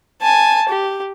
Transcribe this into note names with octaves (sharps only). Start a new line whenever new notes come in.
G#5 A5
G4